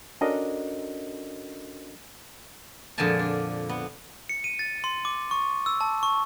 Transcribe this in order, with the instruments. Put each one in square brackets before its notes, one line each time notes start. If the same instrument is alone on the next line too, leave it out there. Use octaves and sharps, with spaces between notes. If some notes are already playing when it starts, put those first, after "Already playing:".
[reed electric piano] C#4 D4 F#4 A4 A#4 D#5
[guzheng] F2 A#2 D3 G#3 G#5 A5
D4
B3
[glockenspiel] C#7
D#7
A6
C6
D6
C#6
E6
A5
C#6